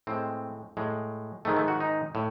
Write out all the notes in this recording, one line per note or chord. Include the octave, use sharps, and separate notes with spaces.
A2 G#3 C4
A2 G#3
G#2 D#3 G#3 A3
A3
F#4
D#4
A2